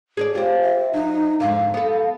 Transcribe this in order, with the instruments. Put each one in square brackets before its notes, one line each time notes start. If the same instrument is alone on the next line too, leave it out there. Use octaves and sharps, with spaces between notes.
[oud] G#4 A#4 D5
[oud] C4 F4 [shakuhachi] G4
[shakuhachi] E5
[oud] F#3 [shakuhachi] D#4
[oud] F2 G#2 D3 [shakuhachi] F5
[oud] B3 A4